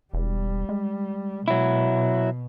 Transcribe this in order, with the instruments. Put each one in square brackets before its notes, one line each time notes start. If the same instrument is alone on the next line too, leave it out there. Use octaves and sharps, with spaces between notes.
[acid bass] E1 [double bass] G3
[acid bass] G#3
[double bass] B2 [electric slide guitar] F#3 E4